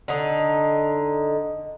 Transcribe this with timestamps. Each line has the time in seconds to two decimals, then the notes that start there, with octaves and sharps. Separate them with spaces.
0.08 D3 D#4